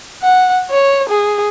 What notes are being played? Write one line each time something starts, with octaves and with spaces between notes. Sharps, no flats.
F#5
C#5
G#4